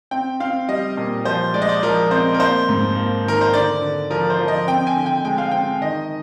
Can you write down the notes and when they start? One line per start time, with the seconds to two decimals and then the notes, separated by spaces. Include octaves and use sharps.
0.11 C4 G5
0.40 C4 F5
0.68 G3 D#5
0.97 A#2
1.25 F3 C5
1.54 G#3 D5
1.62 D#5
1.69 D5
1.83 F3 A#4
2.11 C4 C5
2.34 A#4
2.39 A#3 C5
2.68 G#2
2.96 A#3
3.25 D#3 A#4
3.41 C5
3.54 D3 D5
3.82 D3
4.10 F3 A#4
4.30 C5
4.39 F3
4.48 D#5
4.68 C4 G5
4.87 G#5
4.96 D3
5.06 G5
5.25 G#3 G5
5.38 F5
5.51 C4 G5
5.81 D#3 D#5